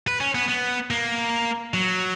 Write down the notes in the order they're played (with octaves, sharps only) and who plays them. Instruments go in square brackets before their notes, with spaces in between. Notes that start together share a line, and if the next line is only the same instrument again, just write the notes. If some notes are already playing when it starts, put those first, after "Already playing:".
[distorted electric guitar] B4
C#4
B3
B3
A#3
F#3